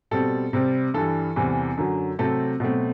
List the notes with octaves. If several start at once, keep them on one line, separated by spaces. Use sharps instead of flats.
B2 G3 C4 A4
C3 G3 C4
G2 E3 G3 A4
E2 C3 E3 G3
F#2 D3 F#3
C3 F#3 A3 C4 A4
B2 F#3 A3 C4